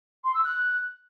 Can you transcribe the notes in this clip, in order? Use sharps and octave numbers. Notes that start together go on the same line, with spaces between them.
C6
E6
F#6